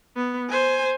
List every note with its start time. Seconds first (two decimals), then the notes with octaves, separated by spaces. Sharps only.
0.16 B3
0.49 C5 G#5